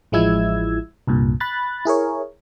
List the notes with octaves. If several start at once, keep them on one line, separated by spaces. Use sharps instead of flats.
A1 F3 G#3 E4 E6 G#6
C2 G2 A#2
B5 F#6 A6
E4 G#4 A#4 C#5